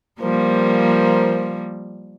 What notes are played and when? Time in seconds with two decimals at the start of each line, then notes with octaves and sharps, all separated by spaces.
0.21 F3 G3 A#3 A#4 C5